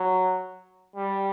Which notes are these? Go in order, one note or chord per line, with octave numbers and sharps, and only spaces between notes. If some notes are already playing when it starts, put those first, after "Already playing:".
Already playing: F#3
G3